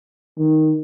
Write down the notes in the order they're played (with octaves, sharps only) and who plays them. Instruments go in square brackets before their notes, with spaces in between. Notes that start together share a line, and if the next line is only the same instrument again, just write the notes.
[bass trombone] D#3